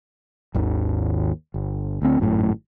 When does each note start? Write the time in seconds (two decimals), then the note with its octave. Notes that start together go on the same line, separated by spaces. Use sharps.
0.55 G#1 D#2 D#3
1.54 G1
2.02 D2 C4
2.20 G#1 F#2 A2